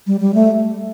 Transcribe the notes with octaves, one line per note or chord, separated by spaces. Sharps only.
G3
G3
A3